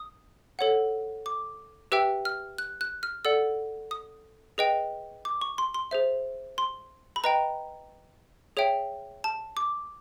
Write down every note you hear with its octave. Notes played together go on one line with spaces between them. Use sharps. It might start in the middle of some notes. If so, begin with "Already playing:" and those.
Already playing: D#6
A4 C#5 F#5
D6
G4 B4 E5 G5 E6
F6
F#6
F#6
F6
A4 D5 F#5 E6
D#6
G#4 B4 D#5 G5
D6
C#6
C6
C6
G#4 C5 E5
C6
B5
B4 D#5 G5 A#5
G#4 C#5 E5 G5
A5
D6